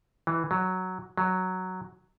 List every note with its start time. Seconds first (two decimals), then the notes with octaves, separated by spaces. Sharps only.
0.27 E3
0.51 F#3
1.17 F#3